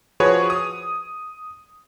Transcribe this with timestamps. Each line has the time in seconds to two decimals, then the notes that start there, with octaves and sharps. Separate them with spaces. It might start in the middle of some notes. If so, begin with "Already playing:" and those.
0.20 F3 F#4 G#4 B4 C#5
0.50 D#6